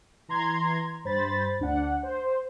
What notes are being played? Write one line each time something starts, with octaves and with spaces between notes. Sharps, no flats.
E3 A#5 C6 G#6
G2 C5 B5 A6
D2 D4 F#5
C5